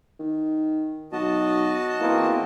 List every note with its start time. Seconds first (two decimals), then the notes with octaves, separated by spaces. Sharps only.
0.20 D#3
1.12 B1 F#4 D#5 A5
2.01 E2 E3 A#3 C4